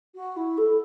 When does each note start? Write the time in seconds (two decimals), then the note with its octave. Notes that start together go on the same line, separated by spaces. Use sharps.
0.15 F#4
0.36 E4
0.57 A4